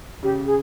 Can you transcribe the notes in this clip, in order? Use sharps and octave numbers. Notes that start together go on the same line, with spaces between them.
C#3 G4
G#4